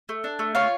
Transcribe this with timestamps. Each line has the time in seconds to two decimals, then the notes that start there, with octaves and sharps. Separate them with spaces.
0.09 A3
0.24 D4
0.39 A3
0.55 F4 C#5 F5